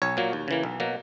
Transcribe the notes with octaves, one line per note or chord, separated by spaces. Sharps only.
B1 C#5
A#2 F#3 A#3
D#2
C#3 E3 A#3
B1
B2 F#3 A#3